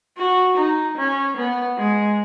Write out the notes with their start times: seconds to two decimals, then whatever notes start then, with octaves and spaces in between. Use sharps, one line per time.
0.18 F#4
0.57 D#4
0.98 C#4
1.37 B3
1.78 G#3